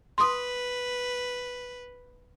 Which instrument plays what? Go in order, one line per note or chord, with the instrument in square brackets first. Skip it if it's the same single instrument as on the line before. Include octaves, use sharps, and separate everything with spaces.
[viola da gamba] B4 [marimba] C6 D#6